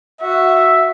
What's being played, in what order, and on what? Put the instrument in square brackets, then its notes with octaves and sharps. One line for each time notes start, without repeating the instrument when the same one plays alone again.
[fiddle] F#4 [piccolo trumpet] E5